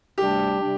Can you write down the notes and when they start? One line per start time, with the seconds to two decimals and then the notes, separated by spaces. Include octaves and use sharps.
0.17 D2 C3 G3 D4 G4
0.59 C3 G3 D4